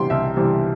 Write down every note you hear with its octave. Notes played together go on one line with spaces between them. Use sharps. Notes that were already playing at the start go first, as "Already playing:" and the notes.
Already playing: C3 E3 G3 G5 C6
C2 E5
C3 E3 G3